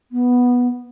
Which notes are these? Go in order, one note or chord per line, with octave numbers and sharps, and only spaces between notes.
B3